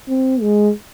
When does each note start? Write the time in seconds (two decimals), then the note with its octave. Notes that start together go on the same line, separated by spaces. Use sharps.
0.08 C4
0.41 G#3